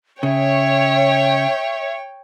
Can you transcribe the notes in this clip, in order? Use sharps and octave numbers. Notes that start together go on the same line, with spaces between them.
C#3 C#5 E5 G5